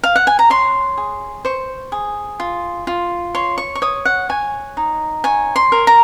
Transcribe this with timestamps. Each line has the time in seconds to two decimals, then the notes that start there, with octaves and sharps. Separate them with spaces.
0.03 F5
0.16 F#5
0.27 G#5
0.39 A#5
0.50 C#5 C6
0.97 G#4
1.45 C5 C#6
1.92 G#4
2.40 F4
2.87 F4
3.35 C#5 C6
3.58 C#6
3.75 C#6
3.82 C#5 D#6
4.05 F#5
4.29 C#5 G#5
4.77 D#4
5.24 C#5 G#5
5.56 C6
5.72 A#4
5.87 A#5